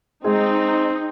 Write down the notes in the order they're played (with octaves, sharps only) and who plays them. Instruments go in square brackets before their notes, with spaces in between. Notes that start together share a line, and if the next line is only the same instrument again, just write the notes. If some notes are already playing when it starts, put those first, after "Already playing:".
[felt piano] G#3 G#4 [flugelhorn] C4 [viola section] D#4